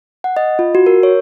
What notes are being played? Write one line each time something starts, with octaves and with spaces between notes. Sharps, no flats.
F#5
D#5
F4
F#4
A#4
C#5